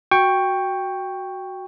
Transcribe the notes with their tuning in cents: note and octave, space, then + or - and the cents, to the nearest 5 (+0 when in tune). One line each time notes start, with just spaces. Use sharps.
F#4 +0 G5 +10 C#6 +0